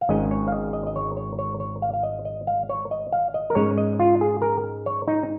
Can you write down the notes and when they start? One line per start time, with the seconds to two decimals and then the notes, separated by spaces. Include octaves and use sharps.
0.01 F5
0.09 G#1 G#2 G#3 C#4 D#5
0.31 C#5
0.48 F5
0.52 D#5
0.73 D#5
0.87 D#5
0.96 C#5
1.17 C#5
1.39 C#5
1.60 C#5
1.82 F5
1.93 F5
2.03 D#5
2.25 D#5
2.47 F5
2.69 C#5
2.91 D#5
3.12 F5
3.34 D#5
3.50 A#4
3.55 G#2 G#3 C#4 C#5
3.78 D#5
4.00 F4
4.21 G#4
4.42 A#4
4.86 C#5
5.08 D#4